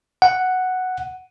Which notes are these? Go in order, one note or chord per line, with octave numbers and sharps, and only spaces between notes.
F#5